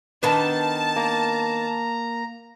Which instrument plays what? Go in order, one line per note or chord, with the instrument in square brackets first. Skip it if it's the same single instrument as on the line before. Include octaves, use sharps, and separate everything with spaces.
[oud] D#3 B3 D4 [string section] A5
[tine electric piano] A#3 [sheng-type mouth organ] A#5